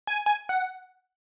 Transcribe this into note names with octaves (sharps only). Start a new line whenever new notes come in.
G#5
G#5
F#5